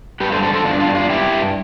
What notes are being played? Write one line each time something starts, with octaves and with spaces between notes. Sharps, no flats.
G2 G4 B4
A4 C5
D3 A4 C5
A4 C5
G2 D4 F4
D4 F4
G2
D4 F4
G2 E4 G4
G2